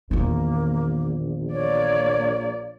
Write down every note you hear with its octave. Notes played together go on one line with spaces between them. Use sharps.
A#1 E2 D#3 A#3
A#3 C#5 D5